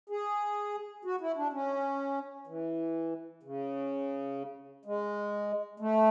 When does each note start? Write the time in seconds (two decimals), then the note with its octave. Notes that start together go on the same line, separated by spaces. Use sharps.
0.10 G#4
1.05 F#4
1.21 E4
1.37 D4
1.53 C#4
2.47 E3
3.43 C#3
4.85 G#3
5.80 A3